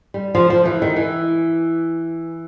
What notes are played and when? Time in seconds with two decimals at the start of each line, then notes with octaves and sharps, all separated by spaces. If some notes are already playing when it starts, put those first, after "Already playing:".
0.14 G3
0.35 F3
0.50 F3
0.65 E3
0.82 D#3
0.96 E3